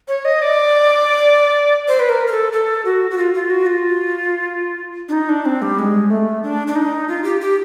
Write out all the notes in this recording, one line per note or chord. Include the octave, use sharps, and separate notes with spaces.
C#5
D#5
D5
C5
B4
A#4
A#4
A4
A4
F#4
F#4
F4
F4
F#4
F4
D4
D#4
D4
C4
G3
G#3
A3
D4
D4
D#4
F4
G4
G4